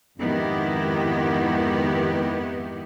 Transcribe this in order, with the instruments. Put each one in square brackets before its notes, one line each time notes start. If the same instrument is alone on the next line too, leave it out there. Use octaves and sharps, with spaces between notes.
[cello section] F2 G#2 D#3 B3 E4 G4